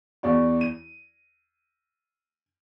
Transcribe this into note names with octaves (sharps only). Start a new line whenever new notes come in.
E2 D5 C#6
D#7